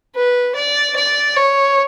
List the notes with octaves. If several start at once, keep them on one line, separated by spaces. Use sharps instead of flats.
B4
D5
D5
C#5